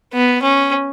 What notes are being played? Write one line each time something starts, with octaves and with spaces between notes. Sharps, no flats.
B3
C#4